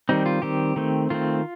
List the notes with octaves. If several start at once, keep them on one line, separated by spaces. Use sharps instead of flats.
D#3 G3 C4 D#4
F4
D#3 G3 C4 G4
D#3 A3 C4
D#3 A3 C4 F4